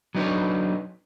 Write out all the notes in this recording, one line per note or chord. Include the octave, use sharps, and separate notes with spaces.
F#3 D4 D#4 B4 C#5